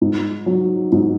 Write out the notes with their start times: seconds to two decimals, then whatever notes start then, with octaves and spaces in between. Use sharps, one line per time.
0.01 G#2
0.46 F#3
0.92 G#2